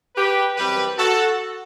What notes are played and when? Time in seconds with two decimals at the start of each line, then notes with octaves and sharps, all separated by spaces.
0.16 G4 B4
0.57 F#2 E3 G3 C4 G4 B4
0.98 F#4 A4